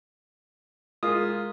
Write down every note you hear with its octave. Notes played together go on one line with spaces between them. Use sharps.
G#3 F4 A#4 D#6